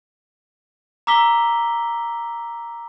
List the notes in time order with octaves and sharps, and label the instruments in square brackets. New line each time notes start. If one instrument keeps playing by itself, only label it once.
[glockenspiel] A#5 D6 E6 B6 G7